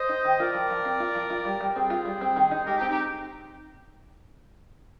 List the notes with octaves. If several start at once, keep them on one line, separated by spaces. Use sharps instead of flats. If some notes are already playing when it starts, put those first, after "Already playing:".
Already playing: C5 D#5
D#4
D#3
F4 A#4 D5
F3
F3
C4
F4
F3
F4
G3
G3
A#4
C4 G#4 C5
F4
G3
C4
D#3
D#4
G#3 G4 A#4
D#4 G4
C4
D#4 G4